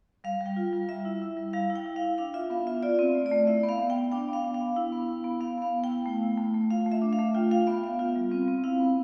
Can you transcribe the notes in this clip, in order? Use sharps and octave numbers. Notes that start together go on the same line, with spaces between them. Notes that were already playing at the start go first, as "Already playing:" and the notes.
G3 F5
G3
G5
F4
G3
G3 E5
E4
E4
G3
G3 F5
E4
G5
E4
F5
E4
D4 F5
F4 E5
B3 F5
F4 E5
F4 D5
C4
A3
D5
A3
E4 E5
B3
F5
B3
G5
B3
D4 G5
B3 F5
D4
F5
B3
E4
B3
E4
B3
B3 F5
B3 F5
B3
G5
E4
A3
E4
A3
A3
F4 F5
A3
E5
D4
F5
A3
F4 G5
F4 F5
B3 E5
B3 F5
F4 F5
G3
C4
C4
E4 F5
B3